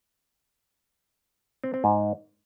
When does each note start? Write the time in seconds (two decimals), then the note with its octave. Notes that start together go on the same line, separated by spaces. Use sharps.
1.64 C4
1.74 C4
1.84 G#2